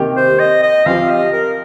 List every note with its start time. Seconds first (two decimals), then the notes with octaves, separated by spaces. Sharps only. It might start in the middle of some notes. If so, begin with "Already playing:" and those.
Already playing: C3 D#3 A#3 G4
0.16 C5
0.40 D#5
0.63 D#5
0.86 F3 C4 G4 F5
1.09 D#5
1.33 A#4